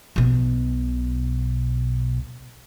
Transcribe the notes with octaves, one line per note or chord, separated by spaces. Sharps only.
B1 B2